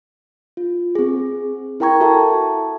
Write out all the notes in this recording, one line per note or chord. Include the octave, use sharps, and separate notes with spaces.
F4
C4 G#4
E4 A#4 G5 A#5 C#6 G#6
F#4 A4 E5 A5 C#6